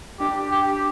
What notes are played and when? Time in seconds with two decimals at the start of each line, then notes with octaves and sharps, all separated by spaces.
0.20 D4 G4
0.52 G4